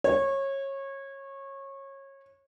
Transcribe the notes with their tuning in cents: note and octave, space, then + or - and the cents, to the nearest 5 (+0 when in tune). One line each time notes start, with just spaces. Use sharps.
C#5 -25